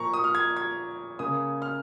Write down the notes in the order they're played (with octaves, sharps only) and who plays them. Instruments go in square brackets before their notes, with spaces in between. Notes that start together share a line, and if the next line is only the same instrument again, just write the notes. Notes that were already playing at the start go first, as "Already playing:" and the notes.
Already playing: [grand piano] A#2 F3 A#3 A#5 C#6
D#6
F6
G#6
G#6
C#3 A#3 D#6
F6